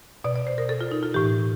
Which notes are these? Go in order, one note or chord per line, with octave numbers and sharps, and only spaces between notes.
B2 D5
D5
C5
A#4
A4
F4
D#4
F4
A2 E3 G4